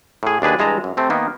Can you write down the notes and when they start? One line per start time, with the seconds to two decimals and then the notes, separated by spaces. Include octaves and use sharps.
0.23 A2 G#4
0.42 D#2 D4 G#4 B4
0.59 G2 E3 G#3 D#5 A5 A#5
0.84 F#2
0.97 C3 A3 C4
1.10 D#3 A#3 B3